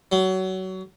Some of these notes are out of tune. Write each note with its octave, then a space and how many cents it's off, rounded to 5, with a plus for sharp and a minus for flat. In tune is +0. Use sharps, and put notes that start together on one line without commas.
F#3 +25